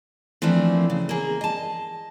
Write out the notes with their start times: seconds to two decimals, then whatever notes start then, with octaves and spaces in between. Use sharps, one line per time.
0.42 E3 F3 A3 A#3 C4 D4
0.90 C#3
1.09 A#3 G#4
1.41 D#5 A5